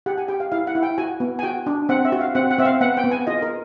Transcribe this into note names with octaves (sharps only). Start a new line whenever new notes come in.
G4 F#5
G#5
G4 G5
F5
E4 F5
F#5
E4
G5
F#4 G#5
B3
G#5
F#4 G5
D4
C4 F#5
E5
F#4
F5
C4 F#5
F#5
C4 E5
F5
B3 F#5
G5
B3
G#5
F4 D#5
A#4